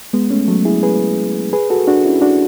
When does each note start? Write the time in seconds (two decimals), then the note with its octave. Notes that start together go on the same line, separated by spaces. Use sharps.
0.13 G#3 B3
0.31 A3 C#4
0.47 F#3 A3
0.65 E4 G#4
0.83 G#4 B4
1.53 G#4 B4
1.70 F#4 A4
1.87 D4 F#4
2.05 C#4 E4
2.22 D4 F#4